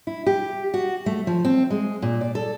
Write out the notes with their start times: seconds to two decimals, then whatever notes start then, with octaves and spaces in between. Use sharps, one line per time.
0.07 E4
0.26 G4
0.74 F#4
1.06 A3
1.27 F3
1.45 C4
1.70 G#3
2.02 A#2
2.21 D5
2.35 A4